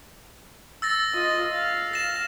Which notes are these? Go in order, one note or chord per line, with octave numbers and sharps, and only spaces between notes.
E6 A6 A#6
F4 D#5
F5
A#6 E7